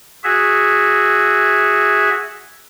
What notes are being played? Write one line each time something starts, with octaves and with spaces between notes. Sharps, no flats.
F#4 G#4 E5